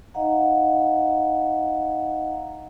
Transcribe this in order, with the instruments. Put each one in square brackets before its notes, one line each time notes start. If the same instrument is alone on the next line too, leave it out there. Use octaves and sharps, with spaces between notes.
[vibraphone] D#4 D#5 F5 F#5 A#5